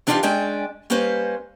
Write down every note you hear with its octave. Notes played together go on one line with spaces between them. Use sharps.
E3 D4 D#4 F4 G4 F5
G#3 C#4 D4 D5 G5 G#5
G3 A#3 C#4 B4 C5